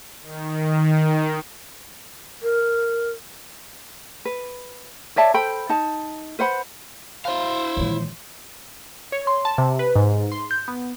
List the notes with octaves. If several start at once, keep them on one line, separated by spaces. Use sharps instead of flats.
D#3
A#4
B4
C#5 D5 E5 A5
A4 C5 G5 B5
D#4 A5
B4 C5 F#5 B5
E4 C5 F5
A#1 D#3 E3 G#3 C#5
C#5
C6
A5
C3
B4
G#2
C6
G6
B3